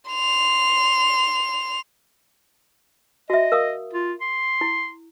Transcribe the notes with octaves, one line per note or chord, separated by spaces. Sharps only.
C6 F7
F#4 D#5 E5
A#4 F5 D#6
F4
C6
E4